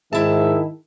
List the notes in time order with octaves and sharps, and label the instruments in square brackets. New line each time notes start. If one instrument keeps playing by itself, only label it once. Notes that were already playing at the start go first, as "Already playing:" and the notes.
[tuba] G#2 [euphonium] D#3 [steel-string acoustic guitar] E4 A5 [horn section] G#4 A#4 E5